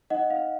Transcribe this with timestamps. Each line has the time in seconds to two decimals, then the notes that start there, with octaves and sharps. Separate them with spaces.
0.10 D#4 D#5 F#5
0.30 F5